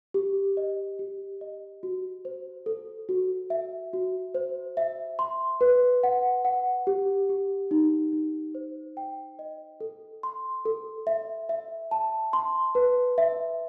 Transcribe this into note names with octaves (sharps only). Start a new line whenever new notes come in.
G4
D#5
G4
D#5
F#4
C5
A4
F#4
E5
F#4
C5
E5
C6
B4
F#5
F#5
G4
G4
D#4
D#4
C5
G5
D#5
A4
C6
A4
E5
E5
A5
C6
B4
E5